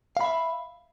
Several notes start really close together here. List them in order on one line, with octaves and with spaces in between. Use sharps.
F5 B5 E5